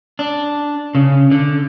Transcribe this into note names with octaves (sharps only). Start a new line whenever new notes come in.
D4
C#3
D3